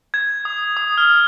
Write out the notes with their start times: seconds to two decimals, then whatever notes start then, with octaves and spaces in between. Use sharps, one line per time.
0.14 G#6
0.45 D#6
0.77 D#6
0.98 F6